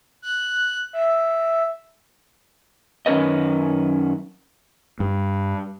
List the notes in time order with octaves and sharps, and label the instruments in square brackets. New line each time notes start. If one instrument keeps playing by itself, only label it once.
[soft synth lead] F#6
E5
[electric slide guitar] F#2 D#3 C#4 A#4 B4 D#5
[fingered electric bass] G2